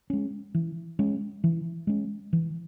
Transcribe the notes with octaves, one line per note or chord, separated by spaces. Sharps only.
G#3 C#4
E3
G#3 C#4
E3
G#3 C#4
E3